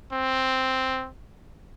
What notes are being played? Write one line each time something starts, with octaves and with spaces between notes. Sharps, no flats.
C4